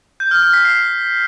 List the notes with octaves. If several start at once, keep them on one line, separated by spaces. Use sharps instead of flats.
G6
F6
F6
B6
C7